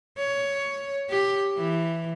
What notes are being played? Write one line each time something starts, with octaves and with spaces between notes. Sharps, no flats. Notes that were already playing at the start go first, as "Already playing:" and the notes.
C#5
G4
E3